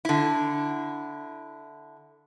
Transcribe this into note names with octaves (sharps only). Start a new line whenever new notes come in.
D3 E4